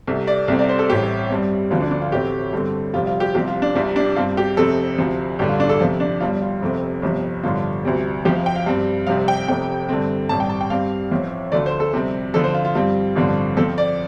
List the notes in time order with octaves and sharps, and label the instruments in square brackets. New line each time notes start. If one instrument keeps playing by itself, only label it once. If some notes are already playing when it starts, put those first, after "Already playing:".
[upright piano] C2 C3 A3
D5
C2 C3 A3 C4
D5
C5
A4
A1 A2 G3 C4 G4
G2 G3 C4
D2 D3 F3 C4 F4
D4
D4
F4
A1 A2 A3 C4 G4
G2 D3 A3 C4
F1 F2 C3 G3 F4
F4
G4
C2 C3 F3 C4 G4
F4
D4
C2 C3 G3 F4
D4
G2 G3 C4 F4
G4
F1 F2 C3 A3 C4 A4
D2 C3 F3 C4
A1 G2 D3 A3 G4
F4
D4
A4
F2 C3 F3 F4
D4
G1 G2 G3 F4
F4
F1 F2 C3 A3 C4
G1 F2 C3 F3
A1 G2 D3 F3 F4
D2 C3 G3 C4
F1 F2 C3 F3 G4
F5
G5
F5
G2 G3 C4
F1 F2 C3 G3 C4 F5
G5
F1 F2 C3 A3 G5
G2 D3 A3 C4
A1 G2 G3 C4 A5
G5
A5
G5
G2 G3 C4 F5
A1 A2 F3 C4
D2 D3 F3 A3 D5
C5
A4
F2 C3 G3 C4
F2 D3 F3 A4
C5
F4
F4
G2 G3 C4 F4
A1 G2 D3 F3 C4
F2 F3 C4 A4
D5